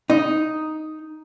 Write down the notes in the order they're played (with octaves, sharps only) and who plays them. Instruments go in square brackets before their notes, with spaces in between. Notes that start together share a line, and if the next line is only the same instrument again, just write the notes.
[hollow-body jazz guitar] D#4